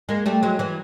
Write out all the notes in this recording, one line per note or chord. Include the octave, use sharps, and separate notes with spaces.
G#3 A#3
G3 A3
F#3 G#3
E3 F#3